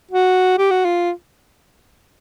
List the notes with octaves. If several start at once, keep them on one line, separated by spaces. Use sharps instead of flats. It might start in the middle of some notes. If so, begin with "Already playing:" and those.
F#4
G4
F#4
F4